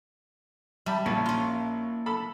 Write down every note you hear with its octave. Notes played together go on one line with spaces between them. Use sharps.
G3 E5 A5 B5
A#1 A#3 C#4 E4 A5
C#4 F4
A4 B5